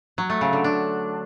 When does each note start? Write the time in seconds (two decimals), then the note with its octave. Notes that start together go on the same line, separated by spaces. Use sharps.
0.18 F#3
0.30 A3
0.41 C#3
0.53 D3
0.64 D4